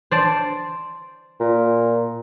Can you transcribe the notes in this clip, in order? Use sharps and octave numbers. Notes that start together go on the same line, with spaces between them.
C5 D5 A5
A#2